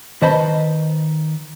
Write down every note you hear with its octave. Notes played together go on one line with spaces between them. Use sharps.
D#3 B4 C5 D#5 A5 B5